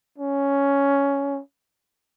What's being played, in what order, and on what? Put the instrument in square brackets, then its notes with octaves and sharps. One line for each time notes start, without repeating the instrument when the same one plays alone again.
[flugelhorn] C#4